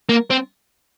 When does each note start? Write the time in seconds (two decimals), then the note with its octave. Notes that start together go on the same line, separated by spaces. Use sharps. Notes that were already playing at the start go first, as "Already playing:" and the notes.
0.09 A#3
0.30 C4